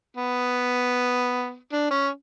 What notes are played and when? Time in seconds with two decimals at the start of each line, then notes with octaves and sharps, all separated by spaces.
0.17 B3
1.72 D4
1.91 C#4